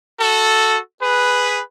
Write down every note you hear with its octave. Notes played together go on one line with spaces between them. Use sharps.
F#4 A4
G#4 B4